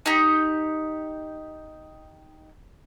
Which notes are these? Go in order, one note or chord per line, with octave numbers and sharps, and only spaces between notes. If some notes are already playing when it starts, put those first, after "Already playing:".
D#4 G4